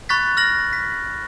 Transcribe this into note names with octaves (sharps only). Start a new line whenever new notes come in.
B5 C#6 F#6 A6 B6
F6 A#6 F#7
B6